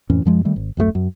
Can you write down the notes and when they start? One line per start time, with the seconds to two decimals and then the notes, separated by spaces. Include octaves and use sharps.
0.10 F2 A2 E3 C#4
0.25 F#2 F3 G#3
0.45 D#3 G3 A3
0.56 G#1
0.77 D1 F#2 F3 A3
0.95 F#2